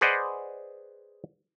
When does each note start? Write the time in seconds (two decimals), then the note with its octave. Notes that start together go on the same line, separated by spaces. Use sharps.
0.01 G#4 B4 C5 D5 D#5 F#5